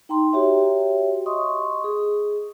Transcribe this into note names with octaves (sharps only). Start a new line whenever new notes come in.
D#4 G5 A#5 C6
F#4 G4 C#5 E5 G5
D#5 C6 C#6 D#6
G#4